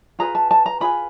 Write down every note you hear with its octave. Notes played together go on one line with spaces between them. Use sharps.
F4 G#4 B4 A#5
A5
A5
A#5
F4 G#4 B4 B5